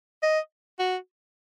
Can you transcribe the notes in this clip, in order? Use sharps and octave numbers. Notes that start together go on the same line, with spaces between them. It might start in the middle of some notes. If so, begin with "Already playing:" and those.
D#5
F#4